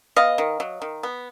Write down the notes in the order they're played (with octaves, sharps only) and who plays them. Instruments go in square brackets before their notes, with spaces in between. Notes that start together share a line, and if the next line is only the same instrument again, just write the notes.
[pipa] B3 D#5 F5
D#3
F#3
D#3
B3